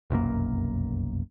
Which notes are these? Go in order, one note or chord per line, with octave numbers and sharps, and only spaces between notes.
F1 B1 F#2 A#3